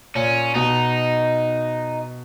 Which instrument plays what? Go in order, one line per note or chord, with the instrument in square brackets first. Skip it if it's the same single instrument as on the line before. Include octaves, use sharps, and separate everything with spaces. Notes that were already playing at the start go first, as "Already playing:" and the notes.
[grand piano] A#2 [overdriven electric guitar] C#4
[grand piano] B2 [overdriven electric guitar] D#4